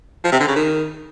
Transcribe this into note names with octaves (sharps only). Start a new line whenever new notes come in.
F3
C3
D3
C#3
D#3